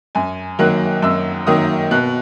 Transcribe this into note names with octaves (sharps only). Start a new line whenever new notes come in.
F#2 G#5
D#3 F#3 A#3 F#6
F#2 E6
D#3 F#3 A#3 D#6
B2 F#6